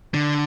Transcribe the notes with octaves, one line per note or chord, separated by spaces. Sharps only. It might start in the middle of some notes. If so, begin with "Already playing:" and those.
D3